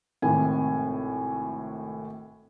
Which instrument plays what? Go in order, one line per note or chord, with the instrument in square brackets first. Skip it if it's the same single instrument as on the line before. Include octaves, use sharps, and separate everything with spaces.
[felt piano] G#1 A2 C3 G#5